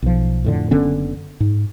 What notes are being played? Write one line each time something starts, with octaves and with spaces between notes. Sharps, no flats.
B1 F3
F2 A2 D3
F#1 D3 B3 C#4
G#2